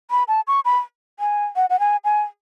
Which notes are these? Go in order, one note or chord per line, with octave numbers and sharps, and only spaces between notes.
B5
A5
C#6
B5
G#5
F#5
F#5
G#5
G#5